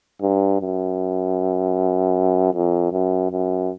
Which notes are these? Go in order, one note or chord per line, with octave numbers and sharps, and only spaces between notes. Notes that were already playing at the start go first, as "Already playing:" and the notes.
G2
F#2
F2
F#2
F#2